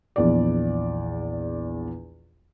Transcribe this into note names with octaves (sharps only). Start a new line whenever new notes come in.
A#1 E2 D5